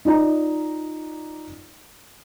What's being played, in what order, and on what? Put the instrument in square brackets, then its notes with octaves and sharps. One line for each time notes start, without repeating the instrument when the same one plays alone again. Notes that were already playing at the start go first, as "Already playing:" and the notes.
[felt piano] D#4 F4 D5 A#5